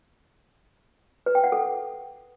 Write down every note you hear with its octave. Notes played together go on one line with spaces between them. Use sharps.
B4
G5
F#5
A4